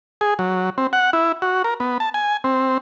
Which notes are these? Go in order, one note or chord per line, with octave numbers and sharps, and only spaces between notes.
G#4
F#3
C4
F#5
E4
F#4
A#4
B3
A5
G#5
C4